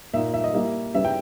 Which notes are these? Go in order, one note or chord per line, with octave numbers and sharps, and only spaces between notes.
A#2 A#3 D#4 E5
E5
D#5
G3 A#3 E4
C#3 G3 B3 E4 E5
G5